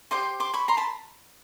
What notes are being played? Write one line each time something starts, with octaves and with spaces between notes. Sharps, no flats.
G4 C5 D#5 C6 D6
C6 D6
B5 C#6
A#5 C6
A5 B5